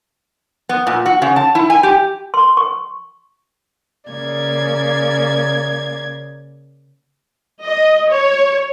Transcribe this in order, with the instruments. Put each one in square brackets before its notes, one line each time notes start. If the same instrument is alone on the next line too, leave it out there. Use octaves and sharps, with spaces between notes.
[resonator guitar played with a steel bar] B3
A#2
F#4
C#3
A5
E4
G#5
G4
[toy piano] C6
C#6
[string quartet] C#3 A#3 D5 G#6
[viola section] D#5
C#5